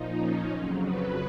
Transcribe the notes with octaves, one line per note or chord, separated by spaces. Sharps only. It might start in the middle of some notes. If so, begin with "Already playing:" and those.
Already playing: A#2 F3 D#4
C#4
F2 C#3 F#3
B4